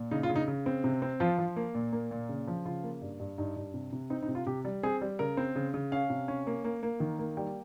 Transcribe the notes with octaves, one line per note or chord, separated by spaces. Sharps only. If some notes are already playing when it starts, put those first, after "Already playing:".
Already playing: A#2
C#3 D#4
F4
C#3
D#4
C#3
C4
C3
C4
F3 F4
F3
A#3
A#2
A#3
A#2
C#3
F3
C#3 F4
A#3
G2
G2
G2 D#4
G2
C3
C3
C4 D#4
D#4
C3
F4
C3 G4
G3
C4 G#4
G3
C#3 A#4
C4
C#3
C#3
C#4 F5
C3
C#4
A#3
A#3
A#3
D#3
A#3
G3 G5